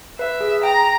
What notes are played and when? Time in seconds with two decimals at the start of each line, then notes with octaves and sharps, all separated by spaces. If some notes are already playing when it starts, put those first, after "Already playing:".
0.19 B4 E5
0.40 G#4
0.63 G5 A#5